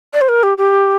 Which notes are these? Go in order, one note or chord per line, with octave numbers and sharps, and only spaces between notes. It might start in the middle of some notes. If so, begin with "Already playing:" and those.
D5
C5
A#4
G4
G4